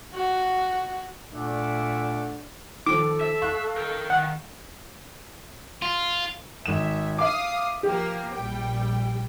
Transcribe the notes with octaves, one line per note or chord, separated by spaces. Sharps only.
F#4
A#2 A3 D4 E5 F#5 D6
D#3 F3 A4 D6
E5
F5 C#6 F#6
A#4 G5
D#3 F#5
F4
G#1 E5 E7
E5 F5 D6 D#6
F3 A#3 G4
A#1 G3 G5